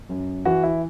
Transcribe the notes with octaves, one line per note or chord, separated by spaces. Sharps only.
F#2
E3 F#4
E4